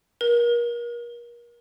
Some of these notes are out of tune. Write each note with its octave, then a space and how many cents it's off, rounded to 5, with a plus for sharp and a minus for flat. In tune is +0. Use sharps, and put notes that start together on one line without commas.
A#4 +35